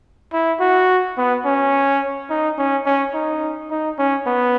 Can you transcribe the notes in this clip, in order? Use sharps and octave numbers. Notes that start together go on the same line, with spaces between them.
E4
F#4
B3
C#4
D#4
C#4
C#4
D#4
D#4
C#4
B3